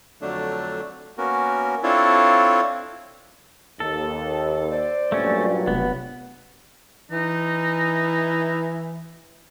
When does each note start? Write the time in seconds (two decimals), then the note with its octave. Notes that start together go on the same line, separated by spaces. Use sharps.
0.21 F2 D3 F#3 A3 D4
1.18 A#3 B3 C#4 F#4 A#4
1.83 C4 D4 E4 F4 A4 C#5
3.80 D#2 A4
4.71 C5 D5
5.12 G2 A#2 F#3 A3 C#4
5.67 F1 B3
7.12 E3 D#4